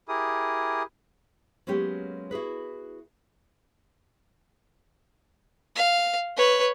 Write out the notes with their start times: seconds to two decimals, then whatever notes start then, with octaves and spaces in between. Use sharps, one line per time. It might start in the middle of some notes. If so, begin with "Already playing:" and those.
0.09 E4 G4 G#4 A#4 D#6
1.67 F#3 G#3 A#3 B3 C#4 G4
2.31 E4 F#4 G#4 B4
5.75 F5
6.37 B4 C#5